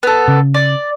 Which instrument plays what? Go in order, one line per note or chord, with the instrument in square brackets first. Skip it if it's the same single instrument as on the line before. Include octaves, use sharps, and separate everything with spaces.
[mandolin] B3 A4
[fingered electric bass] C#3
[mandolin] D5